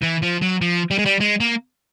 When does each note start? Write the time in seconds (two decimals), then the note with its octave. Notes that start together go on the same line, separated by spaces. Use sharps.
0.03 E3
0.23 F3
0.42 F#3
0.62 F3
0.91 G3
0.98 G#3
1.06 G3
1.20 G#3
1.40 A#3